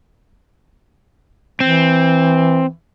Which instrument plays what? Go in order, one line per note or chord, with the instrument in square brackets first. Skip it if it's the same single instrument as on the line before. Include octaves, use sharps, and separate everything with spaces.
[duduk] E3 [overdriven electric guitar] C4